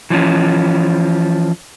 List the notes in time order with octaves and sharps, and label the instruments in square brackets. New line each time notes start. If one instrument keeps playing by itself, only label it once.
[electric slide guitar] E3 F3 C#4